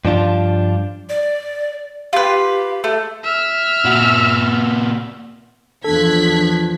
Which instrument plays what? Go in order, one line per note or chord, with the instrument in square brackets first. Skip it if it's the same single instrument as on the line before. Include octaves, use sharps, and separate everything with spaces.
[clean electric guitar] G2 F3 D4 F4
[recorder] D5
[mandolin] F4 B4 [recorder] G4
[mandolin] A3
[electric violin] E5 F6
[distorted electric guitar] A#2 F#4
[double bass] E2 F3 [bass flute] D4 [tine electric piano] A4 [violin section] F#6 G#6 B6